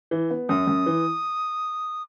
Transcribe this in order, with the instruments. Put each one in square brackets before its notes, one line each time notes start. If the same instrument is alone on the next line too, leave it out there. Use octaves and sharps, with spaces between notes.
[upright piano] E3
B3
[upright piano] F#2 [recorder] D#6
[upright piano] F#2
E3